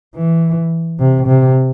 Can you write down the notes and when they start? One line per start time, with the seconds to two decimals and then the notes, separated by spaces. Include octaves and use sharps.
0.15 E3
0.99 C3
1.27 C3